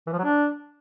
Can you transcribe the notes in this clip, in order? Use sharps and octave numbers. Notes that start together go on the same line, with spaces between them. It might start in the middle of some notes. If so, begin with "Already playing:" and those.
E3
F3
F#3
D4